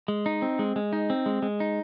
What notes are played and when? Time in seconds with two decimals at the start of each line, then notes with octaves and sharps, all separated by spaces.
0.08 G#3
0.26 D#4
0.42 C4
0.59 G#3
0.76 G#3
0.93 D#4
1.10 C4
1.26 G#3
1.42 G#3
1.60 D#4